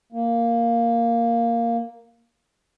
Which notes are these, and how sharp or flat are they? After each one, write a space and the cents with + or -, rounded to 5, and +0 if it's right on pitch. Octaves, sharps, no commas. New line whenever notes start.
A#3 +0